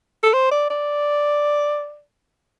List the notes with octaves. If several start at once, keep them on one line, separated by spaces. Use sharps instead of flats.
A4
C5
D5
D5